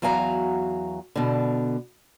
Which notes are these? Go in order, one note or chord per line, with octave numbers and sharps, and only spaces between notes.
E2 F#3 F#4 F5 G#5 A#5
B2 D3